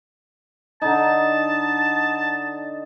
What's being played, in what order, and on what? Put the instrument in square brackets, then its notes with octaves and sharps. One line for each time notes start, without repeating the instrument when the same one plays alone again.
[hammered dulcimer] D3 D#4 [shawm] A5